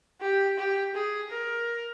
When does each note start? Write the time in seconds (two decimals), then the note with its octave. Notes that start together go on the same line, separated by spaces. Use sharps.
0.21 G4
0.57 G4
0.94 G#4
1.30 A#4